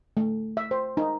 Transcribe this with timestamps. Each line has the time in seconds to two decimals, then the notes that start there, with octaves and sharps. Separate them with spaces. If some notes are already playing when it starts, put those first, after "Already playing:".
0.17 A3
0.57 E5
0.71 C5
0.97 D#4